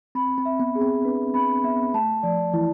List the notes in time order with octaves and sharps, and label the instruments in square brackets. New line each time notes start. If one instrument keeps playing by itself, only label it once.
[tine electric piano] C4 [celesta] B5
[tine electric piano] C4
[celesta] E5
[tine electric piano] B3
[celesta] G#4
[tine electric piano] C4
[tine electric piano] D4 [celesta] B4
[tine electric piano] C4 [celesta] B5
[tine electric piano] B3 [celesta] E5
[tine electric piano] A3 [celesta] A5
[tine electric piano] F3 [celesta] D5
[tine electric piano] E3 [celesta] E4